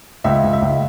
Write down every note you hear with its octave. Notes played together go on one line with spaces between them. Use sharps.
C#2 E5
C#2
E5
C#2